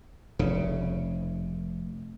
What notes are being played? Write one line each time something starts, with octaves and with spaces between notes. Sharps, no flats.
F1 C#3